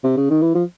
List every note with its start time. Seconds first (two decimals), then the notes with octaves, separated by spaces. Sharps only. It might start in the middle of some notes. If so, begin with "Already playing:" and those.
0.04 C3
0.17 C#3
0.30 D#3
0.42 E3
0.55 F3